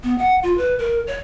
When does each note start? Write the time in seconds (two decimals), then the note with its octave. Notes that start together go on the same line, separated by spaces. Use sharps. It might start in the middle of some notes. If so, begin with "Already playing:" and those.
0.04 B3
0.18 F#5
0.43 F4
0.57 B4
0.79 A#4
1.07 C#5